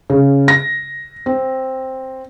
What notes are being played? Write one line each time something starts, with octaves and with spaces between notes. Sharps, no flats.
C#3
A#6
C4